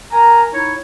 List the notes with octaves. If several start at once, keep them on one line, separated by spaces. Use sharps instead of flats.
A#4 G#5 A#5
D#4 E4 C#5